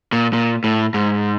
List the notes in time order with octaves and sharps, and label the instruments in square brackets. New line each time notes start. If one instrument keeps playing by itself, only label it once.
[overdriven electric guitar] A#2
A#2
A2
G#2